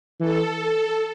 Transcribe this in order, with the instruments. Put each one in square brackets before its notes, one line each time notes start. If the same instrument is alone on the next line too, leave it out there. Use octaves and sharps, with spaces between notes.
[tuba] E3 [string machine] A4